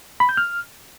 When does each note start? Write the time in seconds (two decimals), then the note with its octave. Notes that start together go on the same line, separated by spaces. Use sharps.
0.20 B5
0.29 G6
0.37 F6